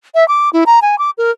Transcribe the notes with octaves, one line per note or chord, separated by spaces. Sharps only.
E5
D6
E4
A#5
G#5
D6
A#4